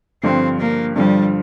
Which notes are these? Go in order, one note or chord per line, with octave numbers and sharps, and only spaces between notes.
G2 D3 F3 C4
A#3
G2 D3 F3 G3